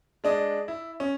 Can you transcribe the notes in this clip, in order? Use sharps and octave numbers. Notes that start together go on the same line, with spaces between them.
G#3 D4 D#5
E4
C#4